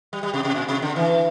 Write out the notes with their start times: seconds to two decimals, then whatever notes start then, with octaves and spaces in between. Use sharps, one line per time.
0.13 G3
0.23 G3
0.34 C3
0.45 C3
0.55 A#2
0.68 C3
0.82 D3
0.96 E3